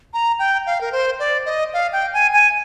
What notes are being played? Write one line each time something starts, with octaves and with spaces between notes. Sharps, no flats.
A#5
G5
F5
A#4
C5
D5
D#5
F5
G5
G#5
G#5